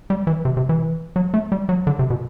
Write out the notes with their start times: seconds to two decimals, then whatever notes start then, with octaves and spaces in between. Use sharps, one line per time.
0.10 G3
0.27 E3
0.45 C3
0.57 C3
0.69 E3
1.16 F#3
1.34 A3
1.52 G3
1.69 F#3
1.87 D3
1.99 C3
2.10 B2